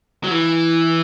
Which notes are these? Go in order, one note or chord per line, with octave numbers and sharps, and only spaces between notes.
F#3
E3